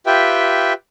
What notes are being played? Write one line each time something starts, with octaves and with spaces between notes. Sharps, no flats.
F4 G4 B4 E5 G5